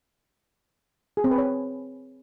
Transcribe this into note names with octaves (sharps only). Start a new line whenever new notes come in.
G#4
C4
B4
C#5